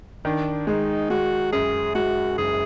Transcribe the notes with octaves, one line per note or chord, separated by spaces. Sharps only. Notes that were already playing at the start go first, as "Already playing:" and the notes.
D#3 D4
G#3 D#4
G#3 F#4
F#2 G#4
G#3 F#4
F#1 G#4